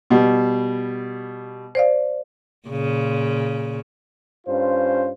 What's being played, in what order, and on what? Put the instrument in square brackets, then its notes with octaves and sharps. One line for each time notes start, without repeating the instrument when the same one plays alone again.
[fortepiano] B2 G3
[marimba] C5 D5 F5
[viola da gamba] A#2 C#3
[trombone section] G2 C#4 F4 C5